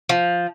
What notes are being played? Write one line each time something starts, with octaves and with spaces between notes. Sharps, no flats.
F3